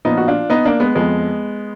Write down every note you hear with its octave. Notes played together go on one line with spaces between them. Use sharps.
A#2 F3 B3 D#4
F#4
D4 F4
B3 D#4
A#3 D4
G#3 B3
F2 F3 G#3 B3